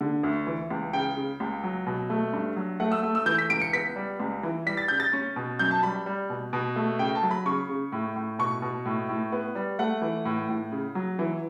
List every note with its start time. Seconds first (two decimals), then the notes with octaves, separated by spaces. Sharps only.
0.01 D3
0.23 D2
0.47 E3
0.70 C#2
0.93 C#3 G5
1.17 C#3
1.40 C#2
1.63 F#3
1.86 B2
2.10 A3
2.33 G2
2.56 F#3
2.80 A3 F#5
2.92 E6
3.03 A3
3.15 E6
3.26 E3 G6
3.38 B6
3.50 C#2 D7
3.61 C#7
3.73 B3 B6
3.96 G3
4.20 C#2
4.43 E3
4.66 G3 B6
4.77 A6
4.88 C#3 G6
5.00 A6
5.13 C#4
5.36 B2
5.59 F#2 G6
5.71 A5
5.83 G3 B5
6.06 G3
6.30 B2
6.53 B2
6.76 A3
6.99 C#3 G5
7.15 A5
7.22 F#3
7.31 B5
7.46 C#3 C#6
7.69 C#3
7.92 A2
8.16 A2
8.39 B2 C#6
8.62 B2
8.86 A2
9.09 A2
9.32 B3
9.55 G3
9.79 A3 F#5
10.02 E3
10.25 A2
10.49 A2
10.72 C#3
10.95 F#3
11.19 E3